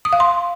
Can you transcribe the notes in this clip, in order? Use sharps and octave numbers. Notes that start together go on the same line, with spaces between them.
D#6
F5
C6